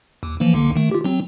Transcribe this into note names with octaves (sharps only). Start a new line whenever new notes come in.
D#2
E3 F3 A#3
C#2 D3 A#3
D#3 A3
F4 G4
F#3 C4